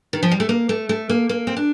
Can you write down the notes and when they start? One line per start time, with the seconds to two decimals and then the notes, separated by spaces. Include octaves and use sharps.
0.13 D#3
0.23 F3
0.31 G3
0.40 A3
0.49 A#3
0.69 A3
0.89 A3
1.10 A#3
1.29 A#3
1.47 C4
1.57 D4